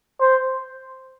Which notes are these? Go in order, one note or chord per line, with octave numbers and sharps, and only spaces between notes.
C5